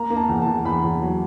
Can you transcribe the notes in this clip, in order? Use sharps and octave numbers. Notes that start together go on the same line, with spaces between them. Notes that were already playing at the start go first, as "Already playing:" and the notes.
Already playing: A#3 A#5
A#3
A5
E2
A5
E2
E2 B5
E2
F#3